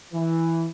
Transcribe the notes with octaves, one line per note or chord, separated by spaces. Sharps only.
E3